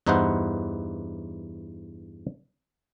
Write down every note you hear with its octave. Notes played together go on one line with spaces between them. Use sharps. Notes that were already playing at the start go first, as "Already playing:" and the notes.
E2 G2 D#4 E4 C5 F#5